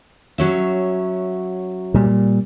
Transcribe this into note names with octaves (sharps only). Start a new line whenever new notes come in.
F#3 C#4 E5
A#2 G3